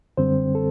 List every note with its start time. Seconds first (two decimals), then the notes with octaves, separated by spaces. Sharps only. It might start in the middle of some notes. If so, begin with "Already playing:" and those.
0.17 F#2 D3 G3 C4 C5
0.55 A4